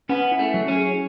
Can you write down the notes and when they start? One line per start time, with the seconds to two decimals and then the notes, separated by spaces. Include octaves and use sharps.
0.09 B3 C#4
0.31 E4
0.39 A3
0.54 F#3
0.68 C#4
0.75 G#4